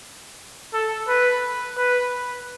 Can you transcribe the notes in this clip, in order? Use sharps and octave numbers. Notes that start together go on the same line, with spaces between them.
A4
B4
B4